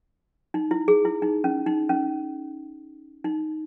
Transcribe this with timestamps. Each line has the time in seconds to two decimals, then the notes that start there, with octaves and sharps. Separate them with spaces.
0.54 D#4
0.71 E4
0.88 G#4
1.05 E4
1.22 D#4
1.44 C#4
1.66 D#4
1.89 C#4
3.24 D#4